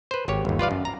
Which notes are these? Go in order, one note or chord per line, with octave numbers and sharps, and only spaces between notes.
B4 C5
G#1 G4 C#5
G1 D#2
F4 B4 D5 F5
F#2
A#5